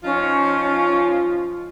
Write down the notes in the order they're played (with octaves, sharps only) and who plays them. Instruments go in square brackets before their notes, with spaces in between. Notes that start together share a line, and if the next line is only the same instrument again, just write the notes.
[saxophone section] F3 D#4 F4 [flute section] C#4